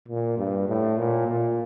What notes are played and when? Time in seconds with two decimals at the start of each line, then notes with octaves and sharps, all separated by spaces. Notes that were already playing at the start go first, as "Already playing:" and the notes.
0.08 A#2
0.38 G2
0.68 A2
0.99 A#2
1.28 A#2